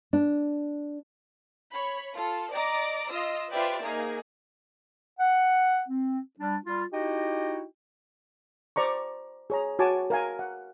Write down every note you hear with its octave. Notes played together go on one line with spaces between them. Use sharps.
D4
C#5 B5
F4 A4
D5 D#5 A#5 D6
F4 D#5 D#6 E6
F4 G4 B4 C5 D5 E5
A#3 D#4 G#4
F#5
C4
G3 D4
G3 F4
D#4 E4 F#4 G4 D#5 G5
C5 D5 A#5 C#6
G#4 C#5 A#5
F#4 C#5 G#5 A5 D6
A#4 F5 G#5
F#5